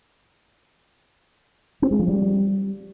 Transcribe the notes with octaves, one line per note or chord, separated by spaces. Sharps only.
C4
G#3
F3
G3